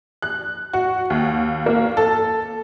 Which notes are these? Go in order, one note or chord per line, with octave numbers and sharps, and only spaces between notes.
F#6
F#4
D#2
A#3
A4